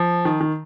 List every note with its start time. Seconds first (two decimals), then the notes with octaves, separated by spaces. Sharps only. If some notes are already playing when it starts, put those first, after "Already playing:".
Already playing: F3
0.25 D#3
0.41 D#3